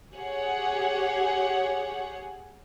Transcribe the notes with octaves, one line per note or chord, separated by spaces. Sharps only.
G4 G#4 C#5 F#5